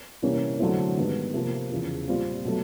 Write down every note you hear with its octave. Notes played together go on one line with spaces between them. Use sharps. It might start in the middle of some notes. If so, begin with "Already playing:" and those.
C3 E3 G3 A#3 C#4
D3 F#3 A3 C4 E4
G#2 D#3 G3 B3
C3 F3 A#3
E2 C#3 F3
A#2 G3 C4 F4
B2 F#3 A3